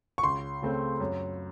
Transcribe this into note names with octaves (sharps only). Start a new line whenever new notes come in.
C#6
C#2 C6
C#3 A3 C4
F#2